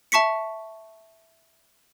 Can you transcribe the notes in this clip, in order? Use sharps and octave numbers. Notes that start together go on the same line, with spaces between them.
E5 A5 C#6 B6 C#7